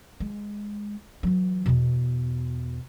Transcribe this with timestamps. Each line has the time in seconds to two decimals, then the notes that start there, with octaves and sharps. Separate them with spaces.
0.20 G#3
1.23 E3 F#3
1.66 E2 B2